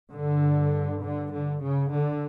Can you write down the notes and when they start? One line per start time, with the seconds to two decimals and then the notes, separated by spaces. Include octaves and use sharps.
0.13 G2 D3
1.04 D3
1.34 D3
1.64 C#3
1.94 D3